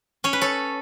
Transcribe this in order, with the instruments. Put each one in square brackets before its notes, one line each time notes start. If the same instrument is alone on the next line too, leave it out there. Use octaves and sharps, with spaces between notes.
[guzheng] C#4 C#5
B4
A4 C#5